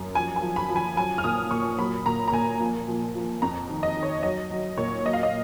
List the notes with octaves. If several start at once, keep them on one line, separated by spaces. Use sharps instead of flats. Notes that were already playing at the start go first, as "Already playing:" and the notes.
Already playing: F#2
F3 G#5
G#5
F3
B5
F3
G#5
F#3 G#5
F6
A#2 D#6
A#2 C#6
F#3 B5
A#2 A#5
A#5
A#2 G#5
F3
F3
F3
F2 A#5
D#3
D#5
D#3
C#5
F#3 D#5
F#3
A#2 C#5
F#3 D#5
F5
D#5